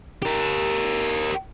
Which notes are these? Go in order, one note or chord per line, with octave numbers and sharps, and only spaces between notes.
G4 A#4